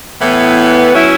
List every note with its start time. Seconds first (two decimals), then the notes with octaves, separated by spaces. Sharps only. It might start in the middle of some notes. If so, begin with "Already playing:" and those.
0.19 A2 E3 B3
0.94 F#3 C#4 E4